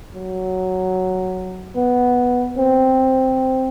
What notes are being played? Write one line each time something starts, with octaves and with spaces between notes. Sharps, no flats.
F#3
B3
C4